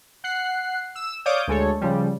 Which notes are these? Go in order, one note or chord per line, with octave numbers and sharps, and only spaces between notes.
F#5 F#6 C7
E6 E7
C#5 D5 F5 D6 D#6 G6
D2 G#3 A4 C#5
C#3 F3 G3